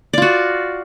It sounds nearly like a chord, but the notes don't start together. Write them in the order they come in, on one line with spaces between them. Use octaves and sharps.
D5 F4 F#4